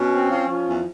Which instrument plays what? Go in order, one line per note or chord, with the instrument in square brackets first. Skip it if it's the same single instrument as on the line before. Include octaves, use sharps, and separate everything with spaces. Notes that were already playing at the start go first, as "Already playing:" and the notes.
Already playing: [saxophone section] B2 [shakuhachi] C#4
[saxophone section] C4
F3
F3
E2